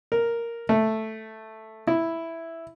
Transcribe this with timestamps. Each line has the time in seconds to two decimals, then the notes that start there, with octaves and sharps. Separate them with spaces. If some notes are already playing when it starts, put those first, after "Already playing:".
0.12 A#4
0.69 A3
1.87 E4